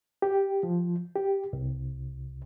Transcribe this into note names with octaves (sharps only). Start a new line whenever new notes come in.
G4
F3
G4
C2